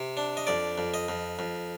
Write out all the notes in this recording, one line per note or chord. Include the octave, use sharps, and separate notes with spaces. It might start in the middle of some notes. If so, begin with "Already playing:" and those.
Already playing: C3
D4
D#5
F2 D5
F2
D#5
F2
F2